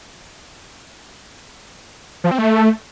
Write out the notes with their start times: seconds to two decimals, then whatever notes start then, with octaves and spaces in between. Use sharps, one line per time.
2.24 F3
2.31 C4
2.38 A3